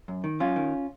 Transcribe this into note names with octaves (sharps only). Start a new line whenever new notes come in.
F#2
D#3
F#2 C#4 F4
D#3